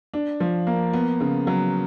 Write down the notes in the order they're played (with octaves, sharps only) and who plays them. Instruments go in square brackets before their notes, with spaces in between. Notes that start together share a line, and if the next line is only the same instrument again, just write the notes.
[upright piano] D4
F3
A#3
B3
C#3
F#3